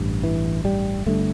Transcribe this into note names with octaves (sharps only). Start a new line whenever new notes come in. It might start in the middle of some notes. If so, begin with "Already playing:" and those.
Already playing: A1 G2
E3
G3
G1 G2 D3 A3